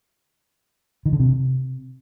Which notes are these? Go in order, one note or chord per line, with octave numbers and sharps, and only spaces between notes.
D#3
D3
C3